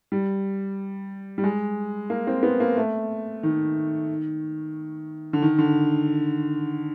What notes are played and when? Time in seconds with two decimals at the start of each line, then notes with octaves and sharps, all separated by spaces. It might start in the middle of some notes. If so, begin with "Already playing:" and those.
0.12 G3
1.38 G3
1.44 G#3
2.10 A#3
2.27 C4
2.43 B3
2.60 A#3
2.77 A3
3.43 D#3
5.33 D3
5.42 D#3
5.58 D3